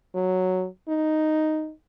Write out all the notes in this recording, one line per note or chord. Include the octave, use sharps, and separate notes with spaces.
F#3
D#4